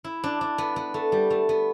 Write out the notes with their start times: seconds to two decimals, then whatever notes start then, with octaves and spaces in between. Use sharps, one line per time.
0.04 E4
0.24 D4
0.41 D4
0.58 B3
0.76 B3
0.94 A3
1.12 G3
1.30 A3
1.49 B3